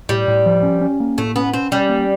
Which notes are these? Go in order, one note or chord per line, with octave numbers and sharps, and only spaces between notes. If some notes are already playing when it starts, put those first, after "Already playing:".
A2 G3
A2
F3
C#4
C#4
A#3
A2 A3
B3 C#4
C4 C#4
G3 C#4
A#3